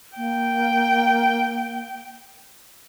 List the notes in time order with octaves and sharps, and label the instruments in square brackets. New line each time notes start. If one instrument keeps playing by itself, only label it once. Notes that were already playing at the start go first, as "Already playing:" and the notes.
[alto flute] A#3 [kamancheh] G5